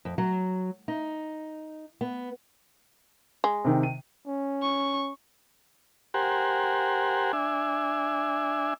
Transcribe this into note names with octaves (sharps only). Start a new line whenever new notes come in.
F2
F#3
D#4
B3
G#3
C3 D#3
D#7
C#4
C#6
G4 A#4 C5 F#5 G#5
D4 E5 G#5